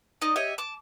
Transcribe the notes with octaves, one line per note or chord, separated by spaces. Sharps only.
D#4 D5 D#5
G4 C#5 D#5 E5
A5 D6